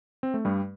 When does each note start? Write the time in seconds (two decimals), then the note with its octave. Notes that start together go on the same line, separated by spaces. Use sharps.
0.23 C4
0.34 A3
0.45 G2 G3